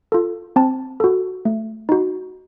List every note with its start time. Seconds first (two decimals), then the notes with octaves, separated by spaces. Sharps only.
0.12 F4 A4
0.56 C4 A5
1.00 F#4 A4
1.45 A3
1.89 D#4 F#4